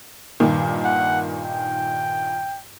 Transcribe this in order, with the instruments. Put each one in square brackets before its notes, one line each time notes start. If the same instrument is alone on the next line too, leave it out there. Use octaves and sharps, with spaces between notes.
[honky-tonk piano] G2 A#2 D#3
[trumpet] F#5
G5